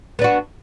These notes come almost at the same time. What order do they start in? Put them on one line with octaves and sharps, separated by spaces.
B3 D4 F#4